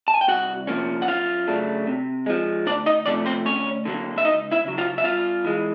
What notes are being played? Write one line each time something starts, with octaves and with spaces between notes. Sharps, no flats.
A5
G#5
G5
C2 F#4 F#5
C3 F3 A#3 C#4
F#5
F#2 F4 F5
C#3 F#3 A3 D4
C3
F3 G#3
D2 D4 D5
D#4 D#5
C3 F3 A3 C#4 D4 D5
C4 C5
D2 C#4 C#5
D3 F#3 A#3
E5
C#2 D#4 D#5
E4 E5
C#3 F#3
F4 F5
E5
G2 F4 F5
E3 G#3